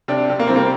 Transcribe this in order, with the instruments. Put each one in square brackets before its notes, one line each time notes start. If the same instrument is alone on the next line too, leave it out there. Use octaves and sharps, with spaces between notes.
[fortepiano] C3 [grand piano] D4
[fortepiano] C3
[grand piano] A#3
[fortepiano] G3 [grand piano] C4
[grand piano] A#3